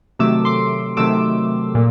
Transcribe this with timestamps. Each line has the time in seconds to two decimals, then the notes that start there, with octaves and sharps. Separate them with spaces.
0.19 C3 D#3 F#3 A3 D6 E6
0.45 C6 D6
0.97 C3 D#3 F#3 A3 D6 E6
1.75 A#2